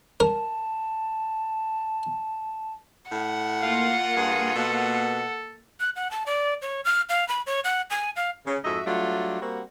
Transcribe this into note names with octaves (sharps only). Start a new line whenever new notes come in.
A#4 A5
A2 F#5
A#3 F4 F5
G2 G#4
B2 A4
F#6
F#5
A5
D5
C#5
F6
F5
B5
C#5
F#5
G#5
F5
C#3
F2 G#2 F#4 D#5 E5
F#3 G3 A3 D4 F4 F#4
G3 A#3 C4 F#4